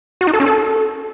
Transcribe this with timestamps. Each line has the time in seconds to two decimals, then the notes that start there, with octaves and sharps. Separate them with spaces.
0.21 F#4
0.27 D#4
0.34 A4
0.40 C#4
0.46 A4